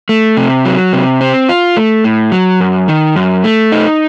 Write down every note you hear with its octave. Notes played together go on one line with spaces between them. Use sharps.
A3
C3
F#3
C3
C4
F4
A3
A2
F#3
F#2
D#3
F#2
A3
D#4